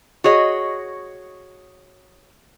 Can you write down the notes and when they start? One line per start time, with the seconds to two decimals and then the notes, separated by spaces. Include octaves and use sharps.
0.24 F#4 G#4 C#5 D#5